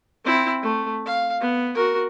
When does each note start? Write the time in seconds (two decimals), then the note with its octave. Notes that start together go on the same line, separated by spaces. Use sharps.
0.24 C4 E4
0.62 A3
1.05 F5
1.41 B3
1.75 F#4 A#4